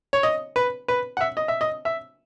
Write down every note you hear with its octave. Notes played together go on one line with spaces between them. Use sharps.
C#5
D#5
B4
B4
F#5
E5
D#5
E5
D#5
E5